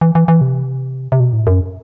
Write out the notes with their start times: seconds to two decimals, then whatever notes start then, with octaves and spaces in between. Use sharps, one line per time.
0.01 E3
0.15 E3
0.28 E3
0.41 C3
1.12 C3
1.20 B2
1.33 A2
1.47 F#2